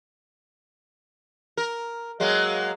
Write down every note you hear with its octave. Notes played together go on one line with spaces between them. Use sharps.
A#4
F#3 G#3 A#3